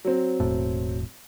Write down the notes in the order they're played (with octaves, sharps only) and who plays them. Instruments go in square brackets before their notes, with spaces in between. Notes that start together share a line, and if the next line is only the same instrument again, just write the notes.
[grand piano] F#3 C4
[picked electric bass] E1 A2